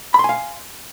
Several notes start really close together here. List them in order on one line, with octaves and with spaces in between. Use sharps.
B5 C6 G#5 F5